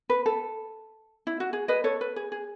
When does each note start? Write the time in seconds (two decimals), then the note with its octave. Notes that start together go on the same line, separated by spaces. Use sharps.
0.10 B4
0.26 A4
1.27 E4
1.40 F#4
1.53 G#4
1.68 B4 D#5
1.84 A4 C#5
2.01 B4
2.16 G#4
2.32 G#4